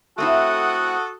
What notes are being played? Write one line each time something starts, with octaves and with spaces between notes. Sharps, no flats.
A3 C4 E4 F#4 A4 F#5 D#6